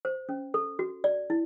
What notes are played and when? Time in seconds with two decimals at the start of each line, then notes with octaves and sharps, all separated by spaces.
0.05 C5
0.29 C#4
0.54 A4
0.79 F#4
1.04 D5
1.30 E4